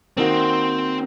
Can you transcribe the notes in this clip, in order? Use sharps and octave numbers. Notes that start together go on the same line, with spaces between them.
D#3 A#3 C4 D#4 F#4